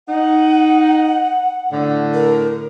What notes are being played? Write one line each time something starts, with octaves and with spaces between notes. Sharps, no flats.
D#4 F#5
A2 D3
A#4